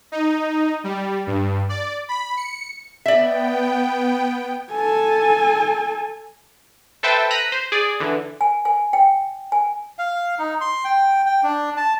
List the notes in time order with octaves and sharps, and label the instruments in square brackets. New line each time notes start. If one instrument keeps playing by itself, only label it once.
[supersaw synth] D#4
G3
G2
D5
B5
C#7
[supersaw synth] B3 G5 [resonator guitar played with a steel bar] D5 E5
[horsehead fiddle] A4 G#5
[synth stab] A4 B4 C5 E5 G5 A5
A#5 F#6 B6 D#7
C5
G#4 D5
D3 E3
[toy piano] G#5
G#5
G5
G#5
[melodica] F5
D#4
C6
G5
G5
D4
A5